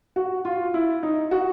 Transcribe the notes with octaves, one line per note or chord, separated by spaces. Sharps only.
F#4
F4
E4
D#4
F#4